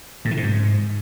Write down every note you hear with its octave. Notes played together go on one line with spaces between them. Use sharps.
A2
E3
C3
G#2